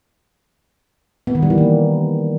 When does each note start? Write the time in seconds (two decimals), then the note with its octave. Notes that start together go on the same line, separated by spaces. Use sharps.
1.27 B3
1.35 D#3
1.43 G3
1.50 E3
1.58 A#3